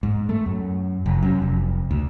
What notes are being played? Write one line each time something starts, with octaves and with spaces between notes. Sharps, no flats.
G#2
A3
F#2
F1
F#2
F1
D2